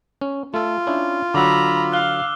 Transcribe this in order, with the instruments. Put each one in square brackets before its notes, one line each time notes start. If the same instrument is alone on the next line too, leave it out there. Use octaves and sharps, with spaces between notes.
[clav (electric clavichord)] C#4
[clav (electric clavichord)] A3 A4 [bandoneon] F4
[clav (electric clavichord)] C#4 D4 E4
[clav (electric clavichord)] D3 F#3 F#4 [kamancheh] A#5 B5 [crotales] D6 E6
[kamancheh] F5 [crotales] F6 F#6 G7